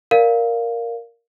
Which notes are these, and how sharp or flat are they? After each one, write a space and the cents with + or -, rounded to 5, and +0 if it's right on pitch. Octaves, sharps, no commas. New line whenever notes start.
A#4 +0 D5 +0 F5 +0